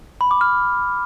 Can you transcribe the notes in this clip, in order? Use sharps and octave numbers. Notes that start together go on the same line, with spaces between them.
B5
D6
F6